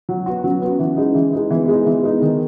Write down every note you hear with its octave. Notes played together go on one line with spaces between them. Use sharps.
F#3
B3 F#4
F#3 C#4
B3 F#4
E3
G#3 D#4
E3
G#3 D#4
E3 B3
G#3 D#4
E3 B3
G#3 D#4
D#3